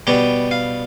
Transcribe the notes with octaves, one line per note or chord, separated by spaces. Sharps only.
B2 G3 B3 G4
F5